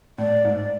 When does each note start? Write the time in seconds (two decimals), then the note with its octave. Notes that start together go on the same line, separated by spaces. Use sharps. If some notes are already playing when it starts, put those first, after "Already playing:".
0.18 A2 D5
0.45 G#2